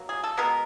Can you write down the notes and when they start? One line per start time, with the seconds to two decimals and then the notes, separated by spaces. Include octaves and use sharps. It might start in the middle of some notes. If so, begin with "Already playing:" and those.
Already playing: B2 F#3 A#3
0.09 G#4
0.24 A4
0.37 B2 G#3 B3 A#4